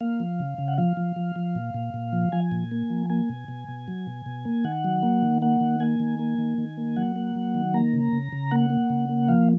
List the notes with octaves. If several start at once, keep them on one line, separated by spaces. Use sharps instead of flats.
A#3 F5
F3
C#3
C#3
F#5
F3 F5
F3
F3
F3
A#2
A#2
A#2
F3
F3 G#5
A#2
A#3
F3
A#3 G#5
B2
B2
B2
F#3
B2
B2
A#3
D#3 F#5
F#3
A#3
D#3
A#3 F#5
D#3
A#3 G#5
D#3
A#3
D#3
D#3
A#3
F#3 F#5
A#3
F#3
D#3
A#3 A#5
C#3
C#3
C#3
A#3 F#5
A#3
C#3
A#3
F3 F5